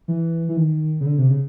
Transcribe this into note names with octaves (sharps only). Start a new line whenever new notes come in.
E3
E3
D#3
C#3
D3
C3
C#3